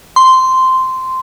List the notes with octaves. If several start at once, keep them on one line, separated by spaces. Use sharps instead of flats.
C6